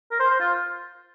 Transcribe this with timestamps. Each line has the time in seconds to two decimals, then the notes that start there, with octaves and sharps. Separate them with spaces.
0.11 A#4
0.20 C5
0.30 C5
0.40 F4